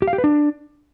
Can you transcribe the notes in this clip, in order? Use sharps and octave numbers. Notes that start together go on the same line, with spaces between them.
G4
F5
G4
B4
D4